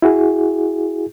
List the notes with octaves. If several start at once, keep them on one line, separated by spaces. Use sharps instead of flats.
E4 F#4 G#4